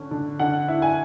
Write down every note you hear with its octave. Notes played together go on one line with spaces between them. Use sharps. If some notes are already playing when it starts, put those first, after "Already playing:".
Already playing: D3 C#4
D3
D3 F#5
E4
G#5